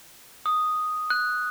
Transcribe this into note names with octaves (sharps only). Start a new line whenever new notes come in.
D#6
F#6